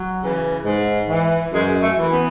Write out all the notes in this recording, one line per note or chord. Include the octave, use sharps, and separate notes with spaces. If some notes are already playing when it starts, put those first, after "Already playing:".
Already playing: F#3
C#3 E3
G#2
E3
F#2 G#3
A3
E3
B3